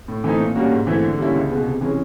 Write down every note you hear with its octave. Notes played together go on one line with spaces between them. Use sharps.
A2
E3 A3 C4 D#4
A#2
G3 A#3 C#4 F#4
G#2
E3 A3 C4 E4
D3
G3 A#3 C#4 E4
C#2
B2 G#3 B3
C3
E3 G#3 C#4